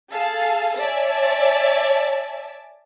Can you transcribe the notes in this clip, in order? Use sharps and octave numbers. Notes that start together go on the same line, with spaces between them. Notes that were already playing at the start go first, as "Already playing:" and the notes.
G#4 A4 F5 A5
C#5 D5 E5 G#5 A5